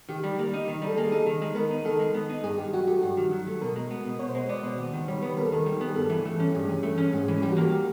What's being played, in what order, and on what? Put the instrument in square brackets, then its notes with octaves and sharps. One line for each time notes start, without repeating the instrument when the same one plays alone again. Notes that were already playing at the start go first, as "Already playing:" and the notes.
[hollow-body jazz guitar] D#3 [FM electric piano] G4
[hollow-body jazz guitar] G3
A#3
D#4
D#3
G3
[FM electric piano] A4
[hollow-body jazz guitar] A#3 [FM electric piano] G#4
[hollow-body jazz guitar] D#4 [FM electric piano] A4
[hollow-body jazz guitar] D#3
G#3
[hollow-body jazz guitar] B3 [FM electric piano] A#4
[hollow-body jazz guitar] D#4
[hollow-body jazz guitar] D#3 [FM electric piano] A4
[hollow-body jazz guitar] G#3
B3
D#4
[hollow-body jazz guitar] G2 [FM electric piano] G#4
[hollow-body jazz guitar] D#3 [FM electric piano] G4
[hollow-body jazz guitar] F#3 [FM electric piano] F#4
[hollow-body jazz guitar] A3 [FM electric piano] G4
[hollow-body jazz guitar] G2 [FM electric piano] F#4
[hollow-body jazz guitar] D#3
F#3
A3
[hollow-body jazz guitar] B2 [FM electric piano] A#4
[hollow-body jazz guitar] G#3
B3
B2
[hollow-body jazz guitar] B2 [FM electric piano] C#5
[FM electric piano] C5
[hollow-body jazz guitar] G#3
[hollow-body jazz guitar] B3 [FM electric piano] D5
[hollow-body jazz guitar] B2
D#2
D#3
[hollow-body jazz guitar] G3 [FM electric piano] C#5
[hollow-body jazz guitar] B3 [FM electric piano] B4
[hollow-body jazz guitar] D#2 [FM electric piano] A#4
[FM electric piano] A4
[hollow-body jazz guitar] D#3 [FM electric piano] A#4
[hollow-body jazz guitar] G3
B3
[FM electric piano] G#4
[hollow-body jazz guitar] G2 [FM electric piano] A4
[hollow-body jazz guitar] E3
A3
C#4
[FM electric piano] G4
[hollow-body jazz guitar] G2 [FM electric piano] G#4
[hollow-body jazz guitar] E3
A3
C#4
[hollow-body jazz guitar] G#2 [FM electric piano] G#4
[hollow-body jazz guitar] E3
[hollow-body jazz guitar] G3 [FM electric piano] G4
[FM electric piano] F#4
[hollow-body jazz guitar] A#3 [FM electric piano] G4